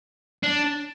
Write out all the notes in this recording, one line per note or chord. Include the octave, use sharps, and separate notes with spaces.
D4